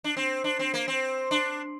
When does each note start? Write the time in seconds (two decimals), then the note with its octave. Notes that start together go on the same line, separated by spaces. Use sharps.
0.04 D4
0.17 C4
0.44 D4
0.59 C4
0.74 A#3
0.88 C4
1.31 D4